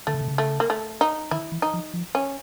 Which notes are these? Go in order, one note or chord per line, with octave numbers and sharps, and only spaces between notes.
D3 A3
C#3
C3
C#3
A3
A#3
A3
D#4
D#3 E4
E3
D#4
F3
F3
C#4